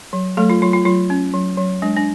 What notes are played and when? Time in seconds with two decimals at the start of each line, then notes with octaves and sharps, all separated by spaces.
0.13 F#3
0.37 F#3 A3 A4
0.50 F4
0.62 F#3 F4
0.73 F4
0.85 F#3 F4
1.10 C#4
1.34 F#3
1.58 F#3
1.82 G#3 D4
1.97 D4